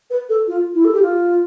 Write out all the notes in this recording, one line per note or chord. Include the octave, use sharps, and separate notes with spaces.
B4
A4
F4
E4
A4
G4
F4